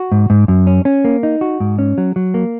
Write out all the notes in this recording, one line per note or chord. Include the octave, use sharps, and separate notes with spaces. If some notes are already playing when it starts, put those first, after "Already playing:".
Already playing: F#4
G#2
G#2
F#2
C#4
C#4
A#3
D#4
F#4
G#2
C#4
F#3
F#3
A#3